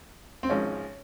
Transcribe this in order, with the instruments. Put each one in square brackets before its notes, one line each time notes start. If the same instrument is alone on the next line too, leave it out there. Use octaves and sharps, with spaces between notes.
[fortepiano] C4
G#1 G#2 F3 C#4